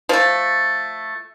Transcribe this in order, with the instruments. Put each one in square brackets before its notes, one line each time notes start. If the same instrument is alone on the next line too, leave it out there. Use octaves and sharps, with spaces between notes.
[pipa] F3 A3